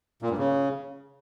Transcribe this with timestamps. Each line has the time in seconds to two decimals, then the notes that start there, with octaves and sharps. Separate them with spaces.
0.22 A#2
0.30 G2
0.38 C#3